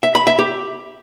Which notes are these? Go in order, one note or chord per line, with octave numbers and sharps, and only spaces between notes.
E5
B5
E5
G4